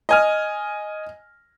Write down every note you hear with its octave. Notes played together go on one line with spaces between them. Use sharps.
D#5 G#5 F6